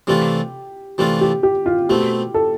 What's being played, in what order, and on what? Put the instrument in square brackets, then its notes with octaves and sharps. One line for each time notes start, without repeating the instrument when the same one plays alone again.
[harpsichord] C3 E3 A3 D4 F4 [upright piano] G4
[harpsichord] C3 E3 A3 D4 F4 [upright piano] G4
[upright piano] G4
G4
F4
[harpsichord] B2 A3 C4 [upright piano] G4
[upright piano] A4